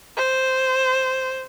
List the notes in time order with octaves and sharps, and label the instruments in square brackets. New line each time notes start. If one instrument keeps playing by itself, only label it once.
[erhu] C5